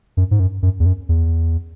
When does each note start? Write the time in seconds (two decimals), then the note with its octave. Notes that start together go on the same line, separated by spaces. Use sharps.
0.17 F#2
0.31 G#2
0.40 F#2
0.62 F#2
0.80 E2
0.86 F#2
1.09 E2